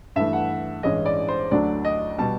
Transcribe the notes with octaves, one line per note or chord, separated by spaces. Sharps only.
G2 E3 A3 E5
F#5
A1 G2 E3 G#3 C#4 D#5
D5
C5
D2 D3 F#3 A3 D4 D5
D#5
B2 G3 A5